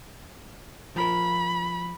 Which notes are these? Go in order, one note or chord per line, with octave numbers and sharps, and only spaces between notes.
F3 F4 A#4 B5